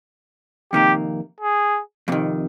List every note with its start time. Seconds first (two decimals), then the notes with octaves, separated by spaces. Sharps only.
0.73 F2 C3 D#3 G3 A#3 G4
1.40 G#4
2.08 F2 C3 D#3